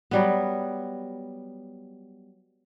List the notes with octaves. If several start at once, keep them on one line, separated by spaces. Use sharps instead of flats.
F#3 G3 B3